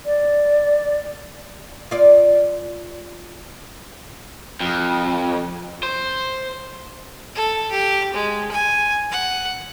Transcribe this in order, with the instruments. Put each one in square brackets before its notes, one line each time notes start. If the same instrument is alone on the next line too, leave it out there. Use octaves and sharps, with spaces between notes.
[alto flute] D5
[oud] F4 D5
[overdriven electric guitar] F2
C5
[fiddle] A4
G4
G#3
G#5
F#5